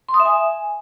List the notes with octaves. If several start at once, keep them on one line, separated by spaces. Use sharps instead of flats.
C6
D#6
E5
G#5